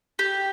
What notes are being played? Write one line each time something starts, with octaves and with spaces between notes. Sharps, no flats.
G4